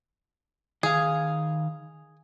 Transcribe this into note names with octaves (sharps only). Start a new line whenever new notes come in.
D#3 G#4 F5